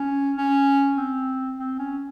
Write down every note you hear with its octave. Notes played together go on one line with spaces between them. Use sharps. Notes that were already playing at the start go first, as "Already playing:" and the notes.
Already playing: C#4
C#4
C4
C4
C#4